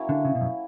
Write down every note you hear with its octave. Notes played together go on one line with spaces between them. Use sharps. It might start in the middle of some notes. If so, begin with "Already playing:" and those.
Already playing: F#3 A#3 C#4 E4
D3
C#3
B2
F#2